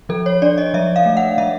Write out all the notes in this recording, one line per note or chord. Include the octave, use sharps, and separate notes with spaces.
F3 A4
C#5
D4 D5
D#5
F3 E5
F5
A3
F#5
F3 E5